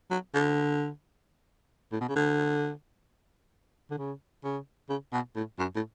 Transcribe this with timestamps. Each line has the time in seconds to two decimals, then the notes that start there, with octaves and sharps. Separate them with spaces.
0.11 F#3
0.34 D3
1.92 A2
2.01 B2
2.09 C#3
2.16 D3
3.91 D3
3.98 C#3
4.44 C#3
4.89 C#3
5.13 B2
5.36 A2
5.59 F#2
5.75 A2